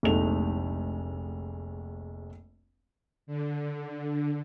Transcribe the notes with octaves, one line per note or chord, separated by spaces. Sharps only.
F1 A#1 G#3 A3 D#4 F7
D3